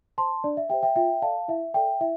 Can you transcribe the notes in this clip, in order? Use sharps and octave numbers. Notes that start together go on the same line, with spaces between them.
C5 A5 C6
D4 D5
E5
G4 C5 E5 G5
E5 G5
F4 E5 G5
A4 D5 F5 A5
E4 E5
A4 D5 E5 G5
E4 E5